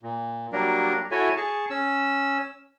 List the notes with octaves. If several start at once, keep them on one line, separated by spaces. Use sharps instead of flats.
A#2
F#3 G3 A#3 D4 A#4
E4 F#4 A4 C#5 E5 G#5
G#4 A5 C#6
C#4 E6